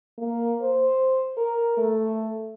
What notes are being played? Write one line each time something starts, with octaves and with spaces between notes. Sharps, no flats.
A#3
C5
A#4
A3